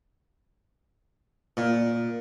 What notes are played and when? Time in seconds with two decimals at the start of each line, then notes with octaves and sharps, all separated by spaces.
1.57 A#2